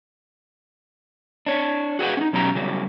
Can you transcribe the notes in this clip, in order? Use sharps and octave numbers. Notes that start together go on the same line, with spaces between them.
D4 C#5
F#4 G#4 B4 F#5
C#4 D#4
B2 F#3 C#4 G4 A#5
C#3 F#3 G3